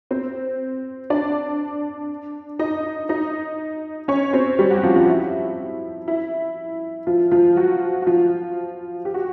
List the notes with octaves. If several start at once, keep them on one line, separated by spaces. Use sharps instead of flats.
C4 C5
D4 D5
D#4 D#5
D#4 D#5
C#4 C#5
C4 C5
G3 G4
F#3 F#4
F3 F4
F3 F4
E4
E4
F3 F4
F3 F4
F#3 F#4
F#4
F3 F4
G4
F#4